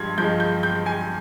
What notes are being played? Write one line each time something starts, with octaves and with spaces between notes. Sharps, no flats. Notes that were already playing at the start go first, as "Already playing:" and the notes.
Already playing: G2 F3 G#3 C6 G#6
G2 F3 G#3 G6
G6
G6
G#5